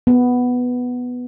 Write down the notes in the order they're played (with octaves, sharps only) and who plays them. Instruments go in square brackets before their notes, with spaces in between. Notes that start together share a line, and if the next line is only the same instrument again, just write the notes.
[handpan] B3